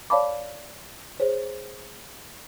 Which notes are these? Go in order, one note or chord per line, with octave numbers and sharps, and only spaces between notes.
C#5 D5 F5 A5 B5 D6
G#4 C5 C#5